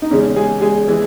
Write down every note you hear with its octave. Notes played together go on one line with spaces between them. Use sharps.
D#4
E2 C#3 G#3 C#4
G#3 G#4
G#3 G#4
E3 G#3